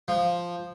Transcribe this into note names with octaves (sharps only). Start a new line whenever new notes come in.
F3